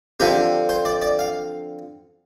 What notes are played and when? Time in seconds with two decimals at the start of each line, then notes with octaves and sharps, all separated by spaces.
0.20 D3 F3 C4 G4
0.69 C5
0.85 D5
1.02 D5
1.19 F5